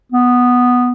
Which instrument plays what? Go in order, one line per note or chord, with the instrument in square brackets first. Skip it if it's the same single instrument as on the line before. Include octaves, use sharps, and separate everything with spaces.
[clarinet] B3